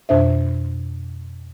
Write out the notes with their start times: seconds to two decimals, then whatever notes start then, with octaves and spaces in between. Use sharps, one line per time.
0.09 F2 B2 D4 C5 E5